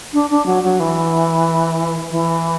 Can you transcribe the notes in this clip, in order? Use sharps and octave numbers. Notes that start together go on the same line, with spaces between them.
D4
D4
F#3
F#3
E3
E3